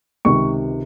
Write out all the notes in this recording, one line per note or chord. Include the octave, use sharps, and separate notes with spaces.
C#2 C3 D#3 C#6